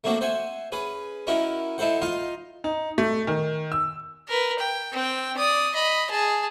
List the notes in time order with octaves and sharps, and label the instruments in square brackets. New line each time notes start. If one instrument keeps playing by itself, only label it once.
[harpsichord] A3 A#3 C4 D4 F#4
C5 E5 F#5 G#5
C#4 G#4 B4
C#4 D#4 E4 F#4 A#4
D#4 E4 A4 C5 F#5
D#4 F4 D#5 F5 C6
[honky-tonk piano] D#4
A3
D#3
E6
[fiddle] A#4 B4
G5
C4 G5
D5 D#6
D#5 B5
G#4 A5